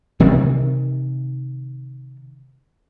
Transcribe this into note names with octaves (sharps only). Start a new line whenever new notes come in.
C3 D#3 E3